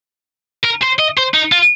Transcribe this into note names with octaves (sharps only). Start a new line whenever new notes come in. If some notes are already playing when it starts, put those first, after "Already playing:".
A#4
C5
D#5
C5
D#4
F4